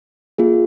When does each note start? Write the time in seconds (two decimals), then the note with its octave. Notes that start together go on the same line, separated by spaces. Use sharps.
0.38 A#3 F4 G#4